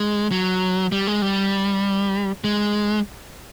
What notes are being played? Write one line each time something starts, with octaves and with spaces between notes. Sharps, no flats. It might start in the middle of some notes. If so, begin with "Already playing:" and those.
Already playing: G#3
F#3
G3
G#3
G3
G#3